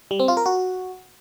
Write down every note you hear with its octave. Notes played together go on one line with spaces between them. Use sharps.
G3
C4
F4
A#4
F#4